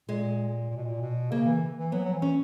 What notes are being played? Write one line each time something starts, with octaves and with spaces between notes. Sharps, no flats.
A#2 G#3
A#2
B2
A#2
B2
C#3 A#3
E3
E3
F#3 B3
F#3
E3
C#4